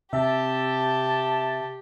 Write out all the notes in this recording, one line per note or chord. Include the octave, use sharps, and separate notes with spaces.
C3 G4 E5 A5